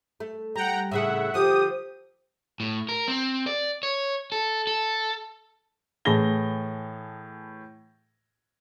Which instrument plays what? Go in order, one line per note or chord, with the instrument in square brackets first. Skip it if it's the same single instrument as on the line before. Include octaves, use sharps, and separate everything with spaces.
[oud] A3
[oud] G3 [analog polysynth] F#5 G5 A#5
[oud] A2 C#3 G#4 [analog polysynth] E5 F#5
[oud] D3 F3 [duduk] G4 [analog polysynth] D#6
[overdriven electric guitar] A2
A#4
C4
D5
C#5
A4
A4
[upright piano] A2 E3 G#4 A5 A#6 G7